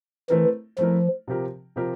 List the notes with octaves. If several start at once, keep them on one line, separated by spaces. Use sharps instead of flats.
E3 A3 C4 E4 A#4
F3 A3 C4 E4 A#4
C3 F3 C4 G4 A#4
C3 F3 C4 G4 A#4